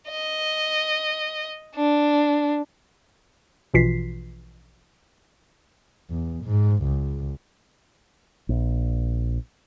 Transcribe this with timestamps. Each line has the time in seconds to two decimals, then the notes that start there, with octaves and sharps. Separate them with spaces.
0.10 D#5
1.75 D4
3.74 A#1 B2 E3 F4 B6 C7
6.10 E2
6.44 G#2
6.83 C#2
8.49 A#1